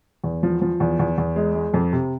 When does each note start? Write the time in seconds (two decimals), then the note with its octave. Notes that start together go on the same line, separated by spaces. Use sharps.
0.24 E2
0.43 F3
0.62 F3
0.80 E2
0.99 E2
1.18 E2
1.36 G#3
1.55 G#3
1.74 F2
1.93 C3